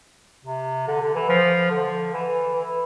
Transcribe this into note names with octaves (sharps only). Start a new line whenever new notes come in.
C3
D3
D3
E3
F3
D3
E3
E3